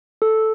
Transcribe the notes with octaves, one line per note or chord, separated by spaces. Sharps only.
A4